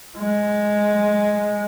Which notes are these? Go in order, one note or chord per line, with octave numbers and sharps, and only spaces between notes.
G#3